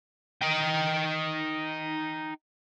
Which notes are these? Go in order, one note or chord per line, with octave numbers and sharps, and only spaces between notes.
D#4 G5